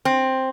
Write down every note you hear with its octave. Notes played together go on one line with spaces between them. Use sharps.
C4